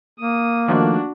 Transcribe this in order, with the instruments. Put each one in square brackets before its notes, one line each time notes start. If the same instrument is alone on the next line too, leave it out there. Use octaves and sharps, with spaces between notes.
[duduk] A#3 [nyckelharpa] D#6
[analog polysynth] D#3 F3 A3 [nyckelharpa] D4 F#4